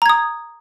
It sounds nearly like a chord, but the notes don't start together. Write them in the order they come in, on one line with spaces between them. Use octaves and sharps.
A#5 G#6 D#6